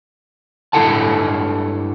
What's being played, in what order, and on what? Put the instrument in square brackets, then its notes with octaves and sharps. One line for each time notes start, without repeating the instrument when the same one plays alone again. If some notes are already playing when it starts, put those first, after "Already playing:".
[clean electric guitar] G2 G#3 E4 A4 F#5 A5